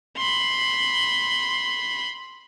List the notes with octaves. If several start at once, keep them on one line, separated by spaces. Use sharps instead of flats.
B5 C6